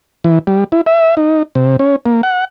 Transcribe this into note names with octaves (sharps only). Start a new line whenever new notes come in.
E3
G3
E4
E5
D#4
C3
C#4
A#3
F#5